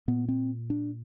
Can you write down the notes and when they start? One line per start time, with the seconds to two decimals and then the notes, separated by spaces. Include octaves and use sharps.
0.08 A#2 B3
0.29 C4
0.70 D4